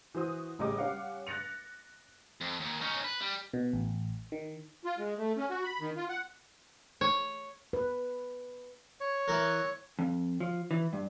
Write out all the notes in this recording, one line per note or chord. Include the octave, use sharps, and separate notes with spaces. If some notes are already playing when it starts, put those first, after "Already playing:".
E3 F#4 C5 D#6
A1 C#3 G3 D#5 D6
G3 C#4 F5 F#5
F#6 A6 A#6 C#7 F7
F2
D#2
C#4 D#4
B4
G3
B2
A1
D#3
F4
G#3
A3
C#4
F#4
B5
D#3
F4
F#5
C#5
B4
C#5
E3 A#4
F2
F3
E3
G2